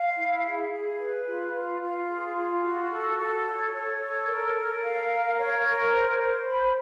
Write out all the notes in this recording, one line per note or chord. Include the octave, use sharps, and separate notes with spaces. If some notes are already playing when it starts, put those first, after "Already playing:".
Already playing: F5
E4
G#4
G#4
B4
F4
F4
F4
G#4
F4
F#4
A4
A4
C#5
C#5
A4
A#4
A#4
F5
A#4
C#5
A#4
C5
C5
B5